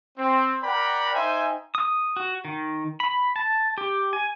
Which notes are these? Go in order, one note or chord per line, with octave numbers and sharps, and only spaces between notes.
C4
A#4 D5 F#5 G5 A#5 B5
D#4 C5 E5 G5 G#5
D#6
F#4
D#3
B5
A5
G4
G#5